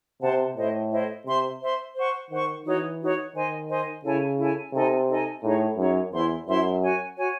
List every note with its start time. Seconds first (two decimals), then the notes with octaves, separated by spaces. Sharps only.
0.22 C3 C5 F#5 A5
0.56 A2 E4 C5 D#5
0.91 E4 C5 D#5
1.26 C3 C5 E5 C6
1.61 C5 E5 C6
1.95 C5 F#5 C#6
2.30 D#3 C5 F#5 C#6
2.65 E3 D#4 F#4 C#5
3.00 D#4 F#4 C#5
3.34 D#3 C5 D#5 G#5
3.69 C5 D#5 G#5
4.04 C#3 E4 A4 C#5 G#5
4.39 E4 A4 C#5 G#5
4.73 C3 D#4 A4 D#5 G#5
5.08 D#4 A4 D#5 G#5
5.43 A2 D#4 G#4 C#5
5.77 F#2 D#4 G#4 C#5
6.12 E2 E4 C5 E5 C6
6.47 F#2 E4 C5 E5 C6
6.82 F#4 C#5 G#5
7.17 F#4 C#5 G#5